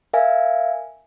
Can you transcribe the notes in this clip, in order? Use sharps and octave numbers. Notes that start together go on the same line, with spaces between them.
A#4 E5 F5 G#5